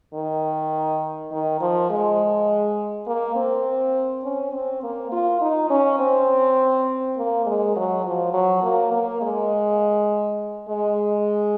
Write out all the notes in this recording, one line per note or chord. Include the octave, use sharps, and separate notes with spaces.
D#3
D#3
F3
G#3
A#3
C4
C#4
C4
A#3
F4
D#4
C#4
C4
A#3
G#3
F#3
F3
F#3
A#3
A#3
G#3
G#3